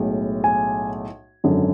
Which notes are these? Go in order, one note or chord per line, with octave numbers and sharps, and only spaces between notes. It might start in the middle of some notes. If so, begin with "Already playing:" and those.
Already playing: B1 A2 G#3
G#5
G#1 F#2 D3